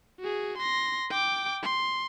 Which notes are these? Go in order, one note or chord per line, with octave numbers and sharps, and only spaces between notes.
F#4 G#4
C6 A#6
G5 D6
C6